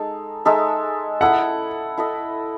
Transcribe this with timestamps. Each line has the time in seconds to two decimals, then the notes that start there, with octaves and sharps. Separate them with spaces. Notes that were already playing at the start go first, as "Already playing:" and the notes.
Already playing: G#3 D#4 A4
0.45 G#3 D#4 A4 E5
1.21 E4 A4 D#5 F#5
1.97 E4 A4 D#5